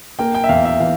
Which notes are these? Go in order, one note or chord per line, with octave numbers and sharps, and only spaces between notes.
A#3 G5
G5
E5
E2 F5
E5
E3 F5